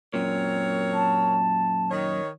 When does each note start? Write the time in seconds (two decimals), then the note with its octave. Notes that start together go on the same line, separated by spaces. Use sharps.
0.14 F#2 A#2 C4 A#4 C#5
0.93 A5
1.91 D#3 C#5